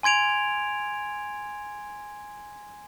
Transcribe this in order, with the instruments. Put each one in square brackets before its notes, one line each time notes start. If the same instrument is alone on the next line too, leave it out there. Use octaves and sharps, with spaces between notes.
[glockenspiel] G#5 C6 G#6 D7 F7